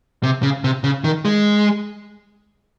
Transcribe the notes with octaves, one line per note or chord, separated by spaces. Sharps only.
C3
C#3
C3
C#3
D#3
G#3